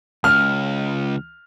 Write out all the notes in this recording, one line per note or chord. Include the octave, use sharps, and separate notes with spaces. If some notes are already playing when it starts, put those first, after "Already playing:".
C#2 F6